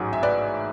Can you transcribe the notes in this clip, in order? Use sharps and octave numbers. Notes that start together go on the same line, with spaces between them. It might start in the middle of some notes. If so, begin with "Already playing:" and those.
Already playing: A1 G#2 F#3 G#4
E5
B4 D5